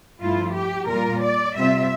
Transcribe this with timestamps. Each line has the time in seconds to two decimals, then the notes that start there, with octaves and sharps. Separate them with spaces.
0.21 G2 F3 A3 E4 F4
0.55 G4
0.89 A#2 G3 A#3 F4 A#4
1.22 D5
1.57 C3 G3 C4 F4 E5